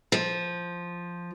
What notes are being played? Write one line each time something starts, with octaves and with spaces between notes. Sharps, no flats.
F3